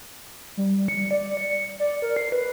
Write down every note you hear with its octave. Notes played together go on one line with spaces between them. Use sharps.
G3
C#7
D5
C#7
D5
A#4
C7
B4